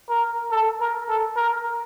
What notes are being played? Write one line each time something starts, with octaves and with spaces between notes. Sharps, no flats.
A#4
A4
A#4
A4
A#4